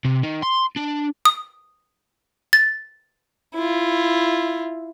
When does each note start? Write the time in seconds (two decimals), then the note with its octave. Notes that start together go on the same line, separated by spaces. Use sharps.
0.05 C3
0.23 D#3
0.42 C6
0.76 D4
1.25 D#6
2.53 A6
3.55 E4 F4